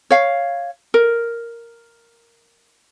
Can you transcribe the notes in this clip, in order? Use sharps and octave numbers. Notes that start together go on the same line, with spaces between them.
C#5 F5
A#4